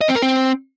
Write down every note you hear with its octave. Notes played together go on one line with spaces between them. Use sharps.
D#5
C4
A#4
C4